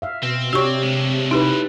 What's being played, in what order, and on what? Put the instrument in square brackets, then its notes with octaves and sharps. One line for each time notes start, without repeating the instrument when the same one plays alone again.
[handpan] E5 F5
[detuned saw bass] B2 [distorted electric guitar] C4
[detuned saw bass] C3 [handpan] D4 G4 C#5 [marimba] F#4 C#6
[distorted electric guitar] G#3 A3
[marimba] D#4 G4 [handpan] E4 B4